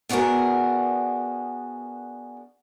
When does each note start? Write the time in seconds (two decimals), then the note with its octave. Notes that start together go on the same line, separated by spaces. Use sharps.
0.09 B3 D4 F#4 G#4 A#4